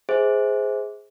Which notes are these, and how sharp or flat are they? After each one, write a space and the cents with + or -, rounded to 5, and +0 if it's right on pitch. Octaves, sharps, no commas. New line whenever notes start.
G#4 +0 C5 +0 E5 -40